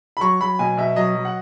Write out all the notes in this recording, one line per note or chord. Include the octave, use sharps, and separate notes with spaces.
B5
F#3 C#6
F#3 B5
B2 G#5
B2 E5
F#3 D#5
F#3
F#5